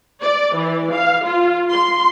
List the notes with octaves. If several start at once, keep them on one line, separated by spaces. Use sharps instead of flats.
D5
E3
F5
F4
C6